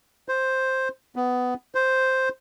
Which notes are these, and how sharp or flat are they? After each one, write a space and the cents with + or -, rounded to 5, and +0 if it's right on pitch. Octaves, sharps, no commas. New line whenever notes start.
C5 +5
B3 +15
C5 +0